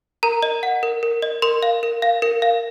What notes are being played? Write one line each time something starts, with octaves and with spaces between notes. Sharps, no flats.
A#4 A#5
D#5
F#5
A#4
A#4
D#5
A#4 C6
F5
A#4
F5
A#4
F5